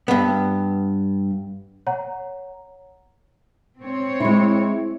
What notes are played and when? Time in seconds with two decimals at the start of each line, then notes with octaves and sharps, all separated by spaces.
0.08 G2 B3
1.87 C#5 F#5 A#5
3.80 C4 C#5
4.20 G#3 E4